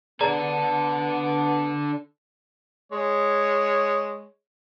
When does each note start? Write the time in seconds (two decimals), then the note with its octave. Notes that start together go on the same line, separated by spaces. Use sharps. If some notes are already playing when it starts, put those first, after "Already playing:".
0.21 B3 D4 G#4 A4 D5 A#5
2.92 G#3 C#5